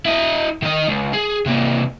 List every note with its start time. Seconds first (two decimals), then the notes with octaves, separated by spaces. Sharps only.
0.05 E4 D#5
0.62 D#3 D#5
0.88 C#2
1.13 G#4
1.46 C3 A#3